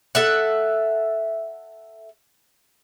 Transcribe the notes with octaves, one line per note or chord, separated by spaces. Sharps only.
A4 E5 F#5